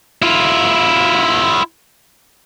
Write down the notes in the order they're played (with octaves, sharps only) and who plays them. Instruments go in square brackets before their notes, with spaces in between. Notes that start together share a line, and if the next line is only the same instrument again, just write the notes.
[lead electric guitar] E4 F4